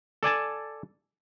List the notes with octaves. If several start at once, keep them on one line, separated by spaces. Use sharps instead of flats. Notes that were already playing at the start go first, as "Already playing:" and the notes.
A4 D5 G#5 A5